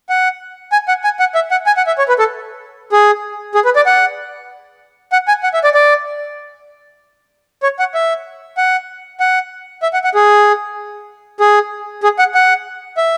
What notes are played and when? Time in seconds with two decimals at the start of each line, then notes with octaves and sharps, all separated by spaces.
0.09 F#5
0.72 G#5
0.88 F#5
1.04 G#5
1.19 F#5
1.35 E5
1.51 F#5
1.67 G#5
1.77 F#5
1.87 E5
1.98 C#5
2.08 B4
2.19 A4
2.92 G#4
3.55 G#4
3.65 B4
3.76 D5
3.86 F#5
5.12 F#5
5.28 G#5
5.43 F#5
5.54 E5
5.64 D5
5.75 D5
7.63 C#5
7.79 F#5
7.94 E5
8.57 F#5
9.20 F#5
9.83 E5
9.93 F#5
10.04 F#5
10.15 G#4
11.40 G#4
12.03 G#4
12.19 F#5
12.35 F#5
12.97 E5